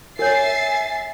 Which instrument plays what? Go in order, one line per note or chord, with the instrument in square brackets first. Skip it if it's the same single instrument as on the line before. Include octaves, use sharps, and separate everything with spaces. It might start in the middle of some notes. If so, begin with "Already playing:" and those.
[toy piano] A#4 C#5 [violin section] E5 A6 C7 [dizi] G#5